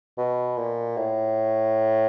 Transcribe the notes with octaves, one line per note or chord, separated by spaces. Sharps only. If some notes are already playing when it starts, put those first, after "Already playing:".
B2
A#2
A2